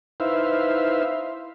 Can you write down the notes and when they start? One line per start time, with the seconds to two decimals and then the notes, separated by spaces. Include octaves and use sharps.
0.20 D#4 E4 B4 C5 E5 F5